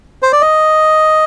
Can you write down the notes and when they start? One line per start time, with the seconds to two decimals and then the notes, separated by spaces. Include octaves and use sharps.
0.22 C5
0.32 D5
0.41 D#5